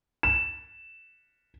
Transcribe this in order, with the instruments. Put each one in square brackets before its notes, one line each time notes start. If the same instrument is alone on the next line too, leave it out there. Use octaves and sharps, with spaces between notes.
[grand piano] E7